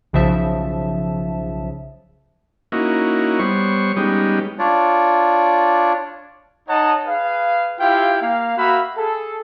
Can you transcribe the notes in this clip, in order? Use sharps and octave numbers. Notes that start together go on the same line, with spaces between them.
B1 C#3 F3 E5 A5
A#3 C#4 D#4 E4 F#4
G3 B3 C5 C#5 C#6
G3 G#3 B3 C#4 D#4 G4
D4 F4 C#5 D5
D#4 C#5 D#5 F#5 A5
G#4 B4 F5
E4 F4 G4 F5 G5
A#3 F5
A#3 F#4 E5 F5 B5
G#4 A4